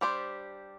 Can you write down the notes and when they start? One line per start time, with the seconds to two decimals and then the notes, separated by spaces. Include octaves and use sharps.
0.01 G3 D4 G4 C5